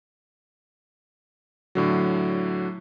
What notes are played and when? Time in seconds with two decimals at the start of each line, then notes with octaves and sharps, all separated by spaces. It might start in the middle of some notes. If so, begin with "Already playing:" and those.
1.75 A2 D3 F#3